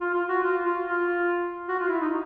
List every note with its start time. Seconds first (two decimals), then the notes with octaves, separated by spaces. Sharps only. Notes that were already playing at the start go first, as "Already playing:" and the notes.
0.01 F4
0.14 F4
0.29 F#4
0.43 F4
0.64 F4
0.84 F4
1.69 F#4
1.80 F4
1.90 E4
2.01 D#4